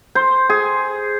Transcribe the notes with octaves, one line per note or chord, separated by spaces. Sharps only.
C5
G#4